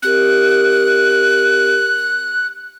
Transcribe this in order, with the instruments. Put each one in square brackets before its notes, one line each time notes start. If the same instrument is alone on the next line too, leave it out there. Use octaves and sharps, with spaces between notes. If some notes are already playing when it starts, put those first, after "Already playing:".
[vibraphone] C4 G4 A#4 [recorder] F#6